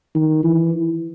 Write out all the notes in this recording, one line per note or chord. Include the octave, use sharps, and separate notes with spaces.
D#3
E3